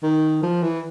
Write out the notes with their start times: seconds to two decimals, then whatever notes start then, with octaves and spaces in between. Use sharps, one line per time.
0.03 D#3
0.43 F3
0.63 E3